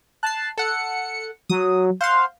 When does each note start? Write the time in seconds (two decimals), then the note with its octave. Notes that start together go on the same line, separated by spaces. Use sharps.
0.23 A5 F#6 C7
0.58 A4 F#5 C#7
1.50 F#3 D#6
2.01 C5 F5 F#5 C6